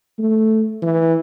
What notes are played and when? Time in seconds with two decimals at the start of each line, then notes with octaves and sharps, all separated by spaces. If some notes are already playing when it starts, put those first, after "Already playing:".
0.19 A3
0.82 E3